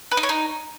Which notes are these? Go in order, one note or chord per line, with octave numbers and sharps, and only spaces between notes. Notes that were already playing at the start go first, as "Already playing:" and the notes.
B4
D#4
C#5
D#4